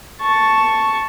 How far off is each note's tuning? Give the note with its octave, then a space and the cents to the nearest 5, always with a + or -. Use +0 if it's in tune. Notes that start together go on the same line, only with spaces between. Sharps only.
A5 +0 C#6 +0